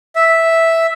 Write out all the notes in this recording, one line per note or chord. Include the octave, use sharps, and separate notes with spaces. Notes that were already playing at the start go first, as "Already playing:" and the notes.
E5